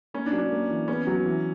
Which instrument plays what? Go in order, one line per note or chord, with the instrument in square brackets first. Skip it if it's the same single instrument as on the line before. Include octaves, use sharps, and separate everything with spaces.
[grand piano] A#3 [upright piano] C#4
[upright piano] D4
[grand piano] F#3
[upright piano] D4
[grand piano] A#3
E3
[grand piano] B3 [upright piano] C#4
[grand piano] F#3
E3